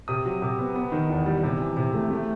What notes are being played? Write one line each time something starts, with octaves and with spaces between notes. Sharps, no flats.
C3 D#6
F#3
C3
B3
B3
D#3
E2
G3
C3
E3
C3
A3
A3